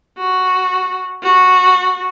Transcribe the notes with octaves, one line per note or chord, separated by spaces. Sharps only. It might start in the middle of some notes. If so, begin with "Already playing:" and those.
F#4
F#4